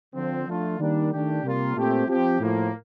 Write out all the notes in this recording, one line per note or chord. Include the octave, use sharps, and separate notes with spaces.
D3 F3 C4
F3 A3 D4 F4
D#3 G3 A#3 D4
D#3 A3 D4 G4
C3 G3 A#3 F4
A#2 A3 C4 G4
F3 C4 G4
A2 F3 A#3